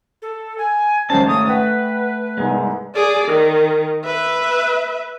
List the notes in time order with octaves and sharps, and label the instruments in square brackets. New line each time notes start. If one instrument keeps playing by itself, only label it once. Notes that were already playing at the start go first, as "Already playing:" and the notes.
[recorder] A4
G#5
[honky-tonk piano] G#1 G#3 C#4 [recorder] C5 [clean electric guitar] A5
[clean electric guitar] A3 [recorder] D#6
[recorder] B4 [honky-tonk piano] F#5 G5
[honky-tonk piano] C2 G#2 B3 [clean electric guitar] G#3
[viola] G#4 D5
D#3
B4 E5